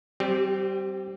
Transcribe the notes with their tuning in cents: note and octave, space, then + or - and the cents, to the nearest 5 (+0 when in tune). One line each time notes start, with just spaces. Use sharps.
G3 -25 C4 +0 G4 +10